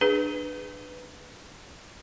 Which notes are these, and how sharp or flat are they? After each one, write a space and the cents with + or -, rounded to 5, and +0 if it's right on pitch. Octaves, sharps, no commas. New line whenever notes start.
D4 +25 G#4 +0 B4 +5